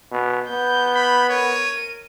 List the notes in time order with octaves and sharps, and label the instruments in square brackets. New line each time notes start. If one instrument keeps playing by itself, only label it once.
[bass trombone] B2
[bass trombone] B3 [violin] G6
[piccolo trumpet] B5
[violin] A#4 D#7 [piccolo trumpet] C#5